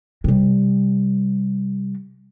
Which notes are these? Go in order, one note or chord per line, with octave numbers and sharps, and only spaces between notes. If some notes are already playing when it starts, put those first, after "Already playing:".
C3 G3